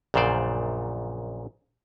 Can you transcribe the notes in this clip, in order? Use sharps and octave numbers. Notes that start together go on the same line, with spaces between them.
A#1 F#2 A#2 C#3 C5 D5